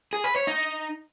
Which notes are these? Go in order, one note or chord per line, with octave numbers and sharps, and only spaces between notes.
G#4
B4
C#5
D#4